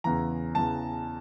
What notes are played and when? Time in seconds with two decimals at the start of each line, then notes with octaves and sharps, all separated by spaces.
0.04 E2 C#3 E3 A#5
0.55 E2 C#3 E3 A5